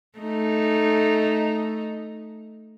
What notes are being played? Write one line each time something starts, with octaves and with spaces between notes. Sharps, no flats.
A3 D#4